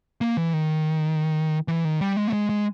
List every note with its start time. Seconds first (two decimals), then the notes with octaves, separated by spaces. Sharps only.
0.21 A#3
0.37 E3
0.53 D#3
1.68 E3
1.85 D#3
2.01 G3
2.16 G#3
2.28 A3
2.33 G#3
2.49 G#3